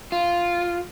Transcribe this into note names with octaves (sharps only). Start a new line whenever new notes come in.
F4